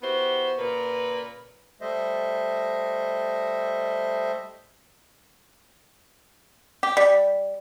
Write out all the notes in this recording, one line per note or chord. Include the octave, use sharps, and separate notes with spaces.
B3 E4 F#4 G4 C5
A#2 C#3 A#4 B4
G3 A3 C5 D#5 E5
G4
G3